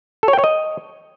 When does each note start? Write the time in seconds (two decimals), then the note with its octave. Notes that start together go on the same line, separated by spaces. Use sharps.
0.23 A4
0.28 C#5
0.33 G5
0.38 C#5
0.44 D#5